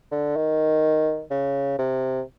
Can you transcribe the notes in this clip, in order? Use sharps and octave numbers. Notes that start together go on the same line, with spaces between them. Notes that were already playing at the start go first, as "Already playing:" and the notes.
D3
D#3
C#3
C3